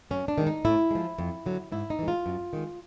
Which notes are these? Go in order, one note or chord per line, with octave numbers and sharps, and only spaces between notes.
F#2 C#4
D4
D#3 G#3
D#4
A2 E4
F3 G#3
F2
D3 F#3
G#2 E4
D#4
E3 G#3
F4
F#2
D#3 G#3